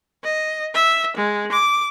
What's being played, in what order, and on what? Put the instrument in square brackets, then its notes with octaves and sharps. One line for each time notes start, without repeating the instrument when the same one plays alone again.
[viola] D#5
E5
G#3
D6